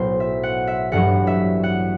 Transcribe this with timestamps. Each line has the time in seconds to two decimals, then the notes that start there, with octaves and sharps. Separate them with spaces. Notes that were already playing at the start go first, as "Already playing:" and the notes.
Already playing: B1 A2 F#3 B3 C5
0.20 E5
0.43 F#5
0.67 E5
0.92 A1 G2 F#3 F#5
1.27 E5
1.64 F#5